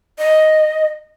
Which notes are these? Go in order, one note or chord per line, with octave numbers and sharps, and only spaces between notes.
D#5